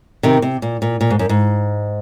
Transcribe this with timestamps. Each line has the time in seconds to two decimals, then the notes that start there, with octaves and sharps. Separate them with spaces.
0.23 C3 D#3
0.42 C3
0.62 A#2
0.82 A#2
1.01 A#2
1.10 G#2
1.19 F#2
1.29 G#2